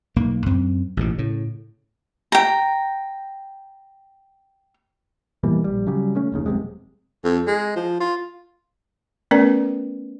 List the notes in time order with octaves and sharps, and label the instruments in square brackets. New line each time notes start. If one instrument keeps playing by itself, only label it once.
[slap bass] B1 A#3
F#2 C4
A1 G#2 B2
A2 C#3
[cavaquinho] G5 A#5
[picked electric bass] B2 E3 G3 A#3
A#1 G3
C#3 F#3 G3
C#3 A3 C#4
F1 D#2 C#3
F1 B1 C3 G#3
[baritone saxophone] F2
G#3
F3
F4
[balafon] A3 B3 C#4 A#4 B4 D5